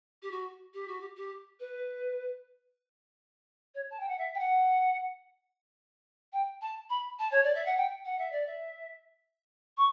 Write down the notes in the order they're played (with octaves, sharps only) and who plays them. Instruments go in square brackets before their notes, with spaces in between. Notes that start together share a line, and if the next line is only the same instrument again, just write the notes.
[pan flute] G4
F#4
G4
F#4
G4
G4
B4
C#5
A5
G5
F#5
E5
G5
F#5
G5
A5
B5
A5
C#5
D5
E5
F#5
G5
F#5
E5
D5
E5
C#6